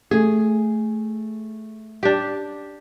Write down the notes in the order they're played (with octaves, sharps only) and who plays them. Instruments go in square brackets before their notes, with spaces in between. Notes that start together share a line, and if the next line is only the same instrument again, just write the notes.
[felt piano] A3 [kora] G#4
[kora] D4 G4